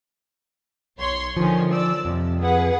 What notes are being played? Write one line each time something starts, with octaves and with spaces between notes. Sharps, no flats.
B1 C#5 C6
D3 D#3 F3 C#4
D5 E6
F2 C3
G#4 B4 F#5